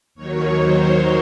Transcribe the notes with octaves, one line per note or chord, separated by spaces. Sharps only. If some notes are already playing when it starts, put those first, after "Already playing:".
D#2 D#3 F#3 C#5
C5